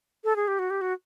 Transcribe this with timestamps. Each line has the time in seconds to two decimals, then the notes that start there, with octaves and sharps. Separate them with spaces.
0.24 A4
0.36 G#4
0.48 G4
0.59 F#4
0.70 G4
0.81 F#4